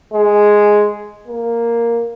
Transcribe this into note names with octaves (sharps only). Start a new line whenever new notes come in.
G#3
A#3